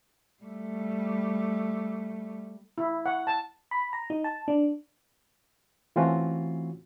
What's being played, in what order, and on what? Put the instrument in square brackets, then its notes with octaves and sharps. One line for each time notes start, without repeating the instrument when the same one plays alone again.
[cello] G3 A3
[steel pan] E4
F#5
A5
[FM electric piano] B5
A#5
D#4
A5
D4
[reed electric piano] E3 A3 C4 C#4 F4 F#4